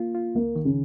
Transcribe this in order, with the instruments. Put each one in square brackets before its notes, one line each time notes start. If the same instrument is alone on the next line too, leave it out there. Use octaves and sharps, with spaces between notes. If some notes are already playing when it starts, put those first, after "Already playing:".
Already playing: [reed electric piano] A#3 F4
F4
[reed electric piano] C#2 [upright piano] A#3
[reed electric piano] D#3
[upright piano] C#3